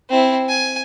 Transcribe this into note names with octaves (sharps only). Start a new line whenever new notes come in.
C4 E4
G#5